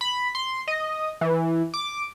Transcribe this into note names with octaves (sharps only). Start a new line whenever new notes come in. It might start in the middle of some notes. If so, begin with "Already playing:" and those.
B5
C6
D#5
E3
D6